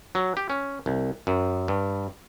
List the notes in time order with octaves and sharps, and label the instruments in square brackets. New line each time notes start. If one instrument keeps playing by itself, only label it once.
[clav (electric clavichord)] F#3
G4
C#4
C2
F#2
G2